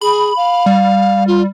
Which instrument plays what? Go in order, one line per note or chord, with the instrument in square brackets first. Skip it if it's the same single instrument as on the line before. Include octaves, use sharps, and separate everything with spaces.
[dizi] G#4 [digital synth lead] B5
[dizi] F5
[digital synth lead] G3
[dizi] F4